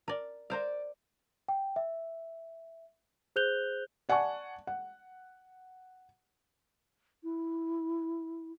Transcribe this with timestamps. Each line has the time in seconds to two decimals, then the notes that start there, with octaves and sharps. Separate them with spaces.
0.08 A#4 D5
0.50 A#4 C5 D5 F5
1.48 G5
1.76 E5
3.36 G#4 C5 F#6 G6 F7 G7
4.09 D5 F#5 G#5 A5 C#6
4.67 F#5
7.24 E4